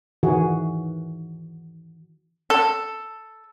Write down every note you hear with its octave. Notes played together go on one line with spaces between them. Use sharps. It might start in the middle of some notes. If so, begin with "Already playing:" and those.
D#3 E3 F#4 G#4
A4